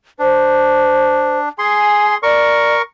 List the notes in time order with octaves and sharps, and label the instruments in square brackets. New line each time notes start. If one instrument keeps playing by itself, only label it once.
[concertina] D4 [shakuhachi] C5
[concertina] G#4 C6 [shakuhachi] G#5
[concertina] A#4 C#6 [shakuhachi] D5